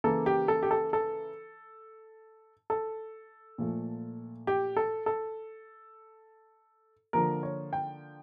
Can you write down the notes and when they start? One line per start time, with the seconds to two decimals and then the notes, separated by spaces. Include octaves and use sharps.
0.04 C#3 E3 A#3 A4
0.26 G4
0.48 A4
0.63 G4
0.71 A4
0.93 A4
2.70 A4
3.58 A#2 F3 A3
4.47 G4
4.77 A4
5.06 A4
7.13 D3 F3 A#3 A#4
7.43 C#5
7.73 G5